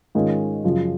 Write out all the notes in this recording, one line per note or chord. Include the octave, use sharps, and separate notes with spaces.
G#2 D#3 G#3 C#4 F4
F#2 C#3 F3